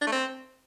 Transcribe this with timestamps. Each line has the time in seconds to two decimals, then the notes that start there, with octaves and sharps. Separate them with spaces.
0.01 D4
0.06 A3
0.12 C4